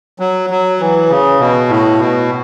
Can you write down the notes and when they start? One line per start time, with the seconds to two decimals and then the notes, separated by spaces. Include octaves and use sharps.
0.20 F#3
0.50 F#3
0.80 E3
1.09 C#3
1.40 B2
1.69 A2
1.99 B2